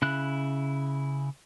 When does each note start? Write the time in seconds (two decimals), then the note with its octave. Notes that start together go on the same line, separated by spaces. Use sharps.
0.02 C#3 E4 F#6